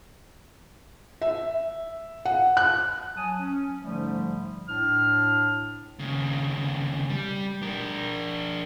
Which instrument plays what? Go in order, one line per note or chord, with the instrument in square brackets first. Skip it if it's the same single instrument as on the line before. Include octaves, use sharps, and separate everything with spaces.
[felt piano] E5
F#5
F#6
[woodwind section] F#3 G#5 A5 D#6
C#4
G#2 D3 F3 G3 A3
A2 D4 F6
[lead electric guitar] D#2 C#3
G3
D4 A#4